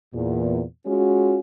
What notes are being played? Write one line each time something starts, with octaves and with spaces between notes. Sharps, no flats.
E2 A#2
G#3 C#4 F4 F#4